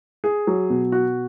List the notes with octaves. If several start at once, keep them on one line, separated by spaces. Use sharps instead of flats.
G#4
F#3
B2
F#4